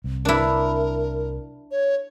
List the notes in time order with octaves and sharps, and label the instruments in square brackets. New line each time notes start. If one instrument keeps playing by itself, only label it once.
[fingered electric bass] C2
[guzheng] D4 E4 [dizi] A#4
[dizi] C#5